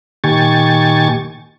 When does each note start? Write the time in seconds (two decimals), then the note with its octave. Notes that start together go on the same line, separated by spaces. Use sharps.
0.24 A#2 D#3 G4 G#5 C#6 A6